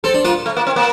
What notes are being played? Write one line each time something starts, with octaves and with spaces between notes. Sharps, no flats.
C4 A4
D4
A#3 F4
A3
A#3
C4
A#3